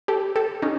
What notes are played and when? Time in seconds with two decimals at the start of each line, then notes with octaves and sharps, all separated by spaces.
0.08 G4 A4
0.36 G4 A4
0.62 C#4 D#4